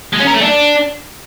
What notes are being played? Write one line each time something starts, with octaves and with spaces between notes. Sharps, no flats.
G#3
C#4
A#4
A3
D4